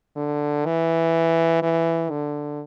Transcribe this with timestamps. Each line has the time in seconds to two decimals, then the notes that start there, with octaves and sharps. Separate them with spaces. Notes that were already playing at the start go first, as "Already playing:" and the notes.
0.16 D3
0.65 E3
1.62 E3
2.10 D3